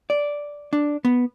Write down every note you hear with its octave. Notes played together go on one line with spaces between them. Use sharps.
D5
D4
B3